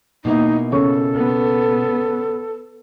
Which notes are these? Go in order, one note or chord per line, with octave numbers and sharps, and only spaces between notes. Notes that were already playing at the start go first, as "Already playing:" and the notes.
B2 A#3 D#4 E4
C#3 A4 C#5 C#6
B3